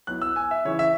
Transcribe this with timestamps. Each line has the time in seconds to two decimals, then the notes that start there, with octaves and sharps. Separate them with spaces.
0.07 F#3 B3 E4 F#6
0.22 E6
0.36 G#5
0.51 E5
0.65 C#3 E3 C#4 E4 C#5
0.79 E5